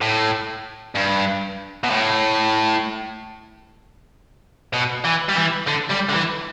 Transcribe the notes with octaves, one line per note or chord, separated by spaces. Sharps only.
A2
G2
B2
A2
B2
E3
G3
E3
D3
G3
D3
E3